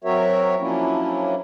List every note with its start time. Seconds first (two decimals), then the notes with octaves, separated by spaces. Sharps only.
0.04 F#3 C4 F#4 A#4 C#5 E5
0.59 F3 F#3 A#3 C#4 D4 E4